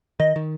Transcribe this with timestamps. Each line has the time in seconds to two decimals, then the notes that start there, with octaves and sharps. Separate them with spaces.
0.20 D#3 D#5
0.36 D#3